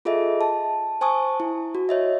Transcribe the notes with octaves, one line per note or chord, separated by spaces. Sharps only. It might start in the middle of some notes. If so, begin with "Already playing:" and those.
F4 G#4 A4 D#5 E5
A5
C5 G#5 A5 C#6 D#6
E4
F#4
C#5 D#5 E5